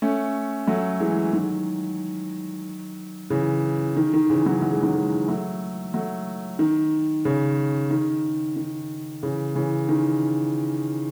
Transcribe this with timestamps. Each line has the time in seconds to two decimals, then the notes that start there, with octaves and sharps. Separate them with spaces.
0.02 A3 C#4
0.67 F#3 A3
1.00 E3 G#3
1.33 D#3 F#3
3.30 C#3 E3
3.96 D#3
4.13 D#3
4.30 C#3 E3
4.46 D#3 F#3
4.62 F#3
4.72 G#3
4.83 D#3 F#3
4.95 E3 G#3
5.28 F#3 A3
5.94 F#3 A3
6.59 D#3
7.25 C#3
7.91 D#3
8.56 D#3
9.22 C#3 E3
9.55 C#3 E3
9.89 D#3